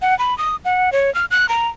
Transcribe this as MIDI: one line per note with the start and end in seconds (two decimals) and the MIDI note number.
0.02 0.17 78
0.19 0.37 83
0.38 0.56 87
0.65 0.92 78
0.92 1.13 73
1.15 1.25 89
1.31 1.48 90
1.49 1.68 82